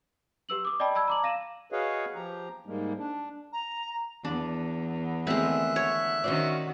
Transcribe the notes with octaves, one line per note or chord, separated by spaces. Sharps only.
G4 B4 E6 F#7
D6 D#6
D5 D#5 G5 A5 B5
A5 B5 E6 G#6
A#5 D6 F#7
F5 A#6 D#7 E7
F#4 G#4 B4 C#5 D#5 F5
F3 G4 A#5
G#2 G3 G#3 A#3
D4
A#5
E2 D4
D3 D#3 G#3 A3 C4 E5 F#6
C#5
D#3 C#4 F#4 C5 D5